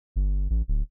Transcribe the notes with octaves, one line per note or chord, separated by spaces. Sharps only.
G1
A1
D1